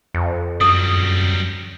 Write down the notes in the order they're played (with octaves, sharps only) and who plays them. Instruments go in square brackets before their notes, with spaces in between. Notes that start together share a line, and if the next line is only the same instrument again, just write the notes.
[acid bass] F2
[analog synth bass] F#2 [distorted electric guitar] F#3 G3 [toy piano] D#6